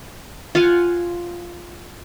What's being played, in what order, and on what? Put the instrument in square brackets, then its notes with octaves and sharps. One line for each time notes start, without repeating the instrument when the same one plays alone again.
[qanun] F4 F5 F#5 G#5